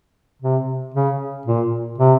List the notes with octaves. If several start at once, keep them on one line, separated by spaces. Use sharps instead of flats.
C3
C#3
A#2
C3